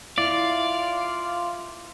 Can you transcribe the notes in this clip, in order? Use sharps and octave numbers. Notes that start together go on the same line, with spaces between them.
E4 F4 D5 F5